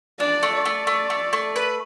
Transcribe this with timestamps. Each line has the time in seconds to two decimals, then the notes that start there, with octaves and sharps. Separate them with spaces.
0.20 D4 D5
0.43 A3
0.54 D5
0.65 A3
0.87 A3
1.10 A3
1.33 A3
1.56 B4